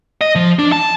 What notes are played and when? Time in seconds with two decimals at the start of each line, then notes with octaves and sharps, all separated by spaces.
0.21 D#5
0.35 F3
0.59 D4
0.72 A5